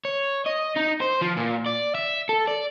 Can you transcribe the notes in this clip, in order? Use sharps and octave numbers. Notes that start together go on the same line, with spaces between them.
C#5
D#5
D#4
C5
F3
A#2
D5
E5
A4
D5